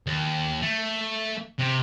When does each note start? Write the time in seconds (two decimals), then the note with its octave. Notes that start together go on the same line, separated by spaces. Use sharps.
0.07 D#2
0.62 A3
1.59 C3